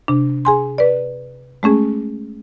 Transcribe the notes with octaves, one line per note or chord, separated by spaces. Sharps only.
C3 D4
G#4 G#5 C6
B4 D5
G#3 A3 C#4 G#4